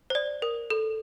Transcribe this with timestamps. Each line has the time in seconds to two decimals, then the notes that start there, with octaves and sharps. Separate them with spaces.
0.10 C5
0.15 D5
0.42 A#4
0.70 A4